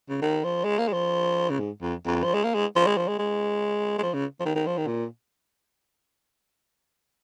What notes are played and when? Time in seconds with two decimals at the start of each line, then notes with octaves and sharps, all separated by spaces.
0.09 C#3
0.22 D#3
0.44 F3
0.64 G#3
0.79 A#3
0.88 G#3
0.93 F3
1.50 C#3
1.59 G#2
1.82 F2
2.06 F2
2.24 F3
2.34 G#3
2.44 A#3
2.54 G#3
2.76 F3
2.87 G#3
2.97 F3
3.08 G#3
3.19 G#3
3.98 G#3
4.03 F3
4.14 C#3
4.40 F3
4.45 D#3
4.55 D#3
4.67 F3
4.77 D#3
4.87 A#2